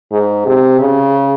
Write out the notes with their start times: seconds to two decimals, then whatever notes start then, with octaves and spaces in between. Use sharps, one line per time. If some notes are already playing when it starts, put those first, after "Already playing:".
0.12 G#2
0.46 C3
0.80 C#3